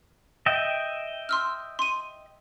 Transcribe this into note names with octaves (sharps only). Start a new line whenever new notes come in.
D#5 E5 G5
C6 E6 F6
C6 D#7